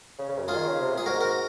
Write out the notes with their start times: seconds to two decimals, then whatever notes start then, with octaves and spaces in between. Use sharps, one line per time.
0.19 C#3
0.29 C#3
0.39 F#2
0.48 F4 G#4
0.55 D#3
0.67 C#3
0.80 C3
0.94 A#2 G#4
1.06 G#2 F#4 A#4
1.21 F#4 A#4